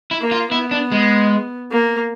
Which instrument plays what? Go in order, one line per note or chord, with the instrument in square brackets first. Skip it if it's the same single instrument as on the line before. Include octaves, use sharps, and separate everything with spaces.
[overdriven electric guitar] E4
[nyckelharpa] A#3
[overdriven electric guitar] F4
[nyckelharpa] B3 [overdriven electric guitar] E4
[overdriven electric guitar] D4
G#3
[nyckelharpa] A#3